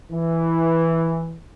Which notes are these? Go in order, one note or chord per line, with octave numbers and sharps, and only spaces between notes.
E3